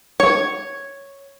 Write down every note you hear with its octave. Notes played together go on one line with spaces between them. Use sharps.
C#5